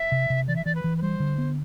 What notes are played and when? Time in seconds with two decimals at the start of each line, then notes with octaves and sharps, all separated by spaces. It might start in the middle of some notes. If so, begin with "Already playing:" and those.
Already playing: E5
0.12 C3
0.30 C3
0.48 E3 D5
0.56 E5
0.65 E3 D5
0.75 B4
0.84 E3
0.98 B4
1.02 G3 C5
1.20 D3
1.38 B3